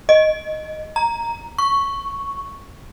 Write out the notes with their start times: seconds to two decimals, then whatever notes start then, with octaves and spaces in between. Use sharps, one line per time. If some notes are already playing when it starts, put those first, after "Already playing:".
0.09 D#5
0.96 A#5
1.58 C#6